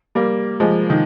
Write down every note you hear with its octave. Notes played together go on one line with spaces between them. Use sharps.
G3 A#3
F3 G#3
D#3